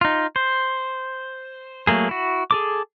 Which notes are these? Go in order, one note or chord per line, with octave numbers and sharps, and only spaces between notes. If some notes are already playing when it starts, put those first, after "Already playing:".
D#4 F4
C5
F#3 A3 A#3 G#4
E4 F#4
G#4 A4 D6